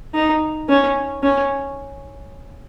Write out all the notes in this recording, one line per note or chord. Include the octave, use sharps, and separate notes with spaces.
D#4
C#4
C#4